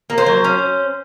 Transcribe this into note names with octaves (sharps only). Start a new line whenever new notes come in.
A#3
C5
F#3
C#4